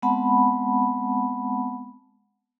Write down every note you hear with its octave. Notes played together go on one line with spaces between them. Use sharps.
G#3 B3 C4 F#5 A5 B5